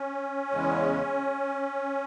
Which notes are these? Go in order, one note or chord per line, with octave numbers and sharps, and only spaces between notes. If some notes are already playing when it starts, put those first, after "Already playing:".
Already playing: C#4
E2 C#3 G#3